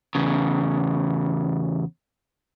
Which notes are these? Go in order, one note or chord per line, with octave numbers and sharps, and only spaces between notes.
E2 C#3